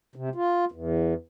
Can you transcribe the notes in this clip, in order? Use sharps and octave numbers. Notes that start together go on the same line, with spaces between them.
C3
F4
E2